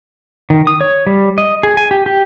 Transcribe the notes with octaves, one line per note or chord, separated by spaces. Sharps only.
D#3
D#6
C#5
G3
D#5
G#4
G#5
G4
G4